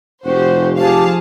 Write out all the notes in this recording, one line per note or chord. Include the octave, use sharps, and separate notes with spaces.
F1 F#4 G4 C5
F3 G4 G#4 F5 A5